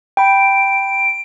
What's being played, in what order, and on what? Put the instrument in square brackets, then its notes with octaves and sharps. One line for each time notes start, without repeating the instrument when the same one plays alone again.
[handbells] G5 B5 [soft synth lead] D7